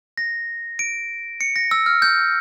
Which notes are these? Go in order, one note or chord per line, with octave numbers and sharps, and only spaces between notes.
A#6
D7
C#7
A#6
E6
F6
G6